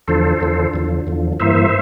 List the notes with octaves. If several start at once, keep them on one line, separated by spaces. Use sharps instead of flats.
E2 D3 F3 A4 C5
E2 D3 F3
E2 D3 F3
E2 D3 F3
G2 E3 A#3 C5 E5